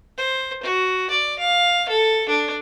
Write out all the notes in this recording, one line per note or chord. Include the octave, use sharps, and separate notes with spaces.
C5
F#4
D5
F5
A4
D4